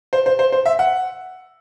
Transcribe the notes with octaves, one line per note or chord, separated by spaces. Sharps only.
C5
C5
C5
C5
E5
F#5